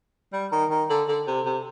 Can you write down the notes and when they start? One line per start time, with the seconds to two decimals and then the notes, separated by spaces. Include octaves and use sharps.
0.33 G3
0.52 D#3
0.70 D#3
0.90 D3
1.08 D3
1.27 C3
1.46 C3